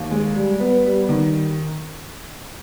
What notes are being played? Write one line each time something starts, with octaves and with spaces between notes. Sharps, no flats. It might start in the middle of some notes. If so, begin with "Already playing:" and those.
Already playing: D#2
G#3
G3
B3
G3
D#3